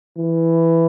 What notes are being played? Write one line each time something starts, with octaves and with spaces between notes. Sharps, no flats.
E3